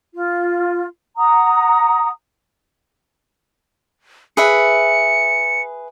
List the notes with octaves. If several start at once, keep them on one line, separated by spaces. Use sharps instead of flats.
F4
F#5 A#5 D#6
G#4 B4 E5 C#7